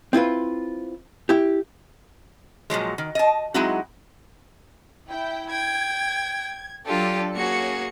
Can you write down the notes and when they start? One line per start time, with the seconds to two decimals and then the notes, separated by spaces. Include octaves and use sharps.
0.13 C4 E4 F4 B4
1.29 E4 G4
2.70 A#2 F3 F#3 G#3
2.98 D#3
3.15 D#5 A5
3.54 F#3 G#3 C4 D#4 E4 F#4
5.09 E4 G5
5.51 G5 G#6
6.86 F#3 D4 F4 G4 A4
7.35 A#3 C#4 F#4 G#4 C#7